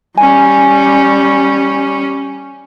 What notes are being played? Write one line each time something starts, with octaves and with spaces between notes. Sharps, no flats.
G3 C#4 G#5